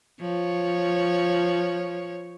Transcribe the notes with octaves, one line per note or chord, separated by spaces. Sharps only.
F3 C#5